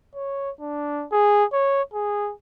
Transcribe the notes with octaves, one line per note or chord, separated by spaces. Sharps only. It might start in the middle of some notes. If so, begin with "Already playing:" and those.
C#5
D4
G#4
C#5
G#4